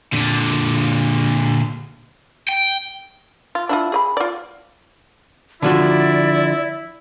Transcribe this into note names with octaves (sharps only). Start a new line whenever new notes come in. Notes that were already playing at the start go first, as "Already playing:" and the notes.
A#2 D3
G5
F4
D4 E4 F4
G#4 D#5 B5
F4 D5
D3 F3 E4 F#4 D5